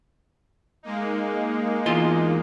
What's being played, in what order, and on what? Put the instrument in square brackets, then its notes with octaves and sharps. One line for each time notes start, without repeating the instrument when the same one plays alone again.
[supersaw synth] G#3 A#3 D#4
[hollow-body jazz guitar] E2 F4 C6